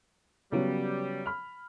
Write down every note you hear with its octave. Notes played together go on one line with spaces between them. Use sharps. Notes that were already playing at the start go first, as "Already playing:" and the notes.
C#3 F#3 G3 B3
B5 F6